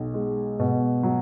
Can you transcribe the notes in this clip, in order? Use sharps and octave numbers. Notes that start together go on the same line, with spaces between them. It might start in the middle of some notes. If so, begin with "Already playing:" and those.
Already playing: B1
G#3
B2
F#3